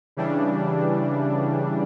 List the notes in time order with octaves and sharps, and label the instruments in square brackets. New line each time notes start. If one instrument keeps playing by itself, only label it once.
[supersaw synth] C#3 E3 G3 D4